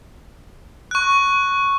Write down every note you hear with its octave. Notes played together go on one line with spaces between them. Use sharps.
C#6 F#6